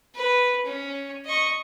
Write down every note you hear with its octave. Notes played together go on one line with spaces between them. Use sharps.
B4
C#4
D#5 C#6